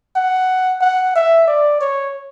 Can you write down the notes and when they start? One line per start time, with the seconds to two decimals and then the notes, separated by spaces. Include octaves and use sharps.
0.16 F#5
0.81 F#5
1.16 E5
1.48 D5
1.81 C#5